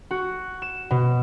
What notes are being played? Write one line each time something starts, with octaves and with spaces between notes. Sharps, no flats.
F#4
E7
B2